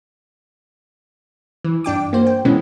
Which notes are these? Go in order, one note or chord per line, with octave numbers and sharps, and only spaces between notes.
E3
G2 D4 G5 D6
A#3 F#4 C5
G5
B2 E3 G#3 B3 C#4